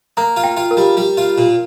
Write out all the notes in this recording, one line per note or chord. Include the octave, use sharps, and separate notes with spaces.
A#3 A#5
F4
G5
F4
A#4
G3
G3
F4
A#2